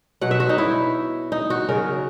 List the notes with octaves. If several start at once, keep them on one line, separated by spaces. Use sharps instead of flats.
B2 F#3 F#5
E5
F#4
D#4
E4
D#4
F#4
C#3 F#3 A#4